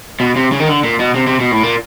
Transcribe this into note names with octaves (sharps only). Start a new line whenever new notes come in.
B2
C3
C#3
D#3
D3
A#2
B2
C3
C3
B2
A2
A#2